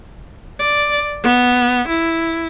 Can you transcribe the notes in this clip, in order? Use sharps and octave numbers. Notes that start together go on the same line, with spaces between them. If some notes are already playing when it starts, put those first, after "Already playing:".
D5
B3
E4